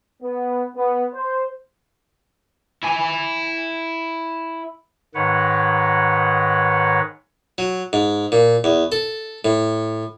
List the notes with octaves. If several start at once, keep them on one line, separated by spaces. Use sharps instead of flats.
B3
B3
C5
E4 G#5
G#2 D#3 B4 C#5 F#5
F#3
G#2
A#2
E2
A4
A2